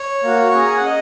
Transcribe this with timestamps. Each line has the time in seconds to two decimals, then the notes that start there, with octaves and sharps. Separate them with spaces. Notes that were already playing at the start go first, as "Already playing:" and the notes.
Already playing: C#5
0.23 A#3 F#4
0.50 C#6
0.54 C#4 G#4 A#5
0.68 G#5
0.77 F#5
0.86 D#5